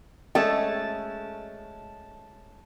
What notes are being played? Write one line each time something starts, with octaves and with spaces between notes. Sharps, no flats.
G#3 A3 C#4 A5